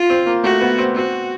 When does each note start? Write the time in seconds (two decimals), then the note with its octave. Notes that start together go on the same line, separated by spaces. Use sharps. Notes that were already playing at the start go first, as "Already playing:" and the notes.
Already playing: F4
0.10 C4
0.27 A#3
0.44 A3 F#4
0.61 B3
0.79 C4
0.95 C4 F#4